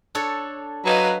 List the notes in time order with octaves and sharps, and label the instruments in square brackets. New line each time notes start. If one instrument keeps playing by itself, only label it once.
[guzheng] D4 A4 C#5
[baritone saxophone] F#3 [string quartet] B4 D#5 F5